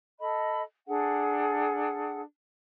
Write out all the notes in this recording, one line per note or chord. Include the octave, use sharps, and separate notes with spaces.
A4 D#5 B5
D4 G#4 A4 F#5